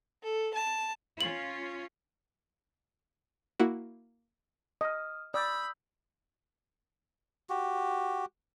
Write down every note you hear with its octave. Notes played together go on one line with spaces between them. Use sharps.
A4
A5
C#4 F4 F#7
A#3 E4 F#4
D#5 D#6 F6
D5 B5 D#6 E6 G6
F#4 G4